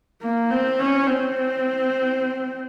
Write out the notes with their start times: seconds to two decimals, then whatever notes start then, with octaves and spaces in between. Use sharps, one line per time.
0.22 A#3
0.50 C4
0.79 C#4
1.07 C4